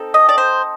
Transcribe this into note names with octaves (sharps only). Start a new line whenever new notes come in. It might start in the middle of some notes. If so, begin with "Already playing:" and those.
Already playing: C4 D#4 A4
D#5
D5
C5